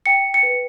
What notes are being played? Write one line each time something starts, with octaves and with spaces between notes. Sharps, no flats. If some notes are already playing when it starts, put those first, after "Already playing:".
G5 C#7
G5
C#7
B4